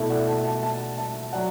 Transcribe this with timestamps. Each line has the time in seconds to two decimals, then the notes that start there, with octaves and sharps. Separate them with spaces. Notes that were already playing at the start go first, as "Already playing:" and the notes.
Already playing: B2 A3 E4 E5 A5
0.09 D5 F#5
0.27 E5 A5
0.44 E5 A5
0.62 E5 A5
0.97 E5 A5
1.33 F#3 D5 F#5